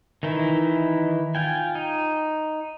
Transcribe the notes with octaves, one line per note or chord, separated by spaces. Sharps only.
D#3 E3 D#4 E4
F4 G5 G#5
D#4